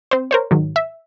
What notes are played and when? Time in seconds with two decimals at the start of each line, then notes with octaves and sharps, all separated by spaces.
0.11 C4 C5
0.31 A#4 C5 C#5
0.51 G#2 D#3 F#3
0.76 E5